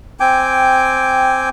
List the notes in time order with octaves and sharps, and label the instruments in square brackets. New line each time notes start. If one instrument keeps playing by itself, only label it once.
[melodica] C4 G5 G#5 D6